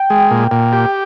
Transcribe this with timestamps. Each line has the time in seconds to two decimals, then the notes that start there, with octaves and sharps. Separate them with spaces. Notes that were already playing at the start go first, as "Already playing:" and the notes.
Already playing: G5
0.10 G#3
0.31 A#2
0.51 A#2
0.73 G4